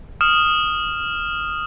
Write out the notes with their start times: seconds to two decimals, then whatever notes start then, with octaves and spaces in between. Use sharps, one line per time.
0.21 D#6 F6 E7